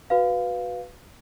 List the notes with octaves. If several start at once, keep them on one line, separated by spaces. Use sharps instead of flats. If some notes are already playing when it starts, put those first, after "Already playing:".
F#4 B4 F5